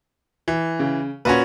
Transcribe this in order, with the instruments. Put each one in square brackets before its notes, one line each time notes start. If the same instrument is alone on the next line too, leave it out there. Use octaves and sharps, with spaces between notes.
[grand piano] E3
[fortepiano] C#3
[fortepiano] A#2 [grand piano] C#4 F#4 B4